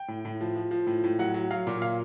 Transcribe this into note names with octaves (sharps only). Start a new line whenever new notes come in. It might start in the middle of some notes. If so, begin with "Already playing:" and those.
Already playing: G5
A2
A2
F3
F3
F3
A2
A2
F#3 F#5
F#3
F#3 F5
A#2
F5